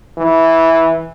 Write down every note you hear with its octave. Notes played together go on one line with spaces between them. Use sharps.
E3